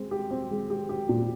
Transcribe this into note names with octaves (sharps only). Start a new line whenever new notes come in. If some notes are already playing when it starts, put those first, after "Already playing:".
Already playing: G#3 C4
G4
C4
G#3
G4
G4
A#2